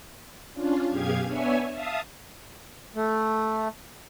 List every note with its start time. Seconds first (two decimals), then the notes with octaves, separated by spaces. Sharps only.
0.54 C#4 D4 F4
0.88 F#2 B2 G4 G#4 F5 G#6
1.26 B3 D4 C#5 E5 G#5
1.70 E5 F5 A5 D#6
2.96 A3